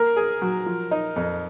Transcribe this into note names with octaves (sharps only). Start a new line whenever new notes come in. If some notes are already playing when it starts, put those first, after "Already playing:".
Already playing: A#3 A#4
G#4
F#3
F3
D#4
F2